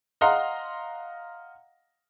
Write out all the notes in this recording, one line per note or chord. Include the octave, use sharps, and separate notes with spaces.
D#5 F5 F#5 A#5 C6